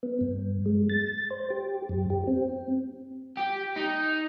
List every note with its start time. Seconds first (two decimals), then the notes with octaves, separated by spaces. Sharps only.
0.03 B3
0.21 G2
0.66 G#3
0.90 A6
1.30 C5
1.50 G4
1.89 F#2
2.10 G4
2.27 C4
3.37 G4
3.77 D#4